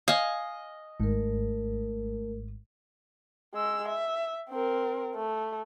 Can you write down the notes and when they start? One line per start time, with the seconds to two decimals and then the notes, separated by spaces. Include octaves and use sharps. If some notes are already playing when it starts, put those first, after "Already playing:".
0.08 D#5 F5 G#5
1.00 G#1 G#2 A3 A#4
3.54 G#3 E6
3.89 E5
4.49 C4 A#4
5.15 A3